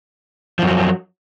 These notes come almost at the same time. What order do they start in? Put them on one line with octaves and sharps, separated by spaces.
F3 F#2 F#3